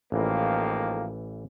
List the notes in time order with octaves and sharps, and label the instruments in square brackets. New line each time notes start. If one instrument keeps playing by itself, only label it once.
[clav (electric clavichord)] A1 E3 [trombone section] F2 G#2 A#3